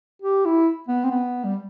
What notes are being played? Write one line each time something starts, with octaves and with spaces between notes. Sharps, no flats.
G4
E4
B3
C4
B3
G3